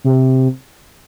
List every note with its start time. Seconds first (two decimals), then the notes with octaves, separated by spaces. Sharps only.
0.04 C3